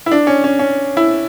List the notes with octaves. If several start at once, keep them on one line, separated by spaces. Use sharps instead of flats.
E4
D4
C#4
C#4
C#4
E4